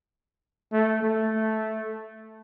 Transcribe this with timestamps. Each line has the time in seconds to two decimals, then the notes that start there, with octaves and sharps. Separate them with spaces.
0.73 A3
1.03 A3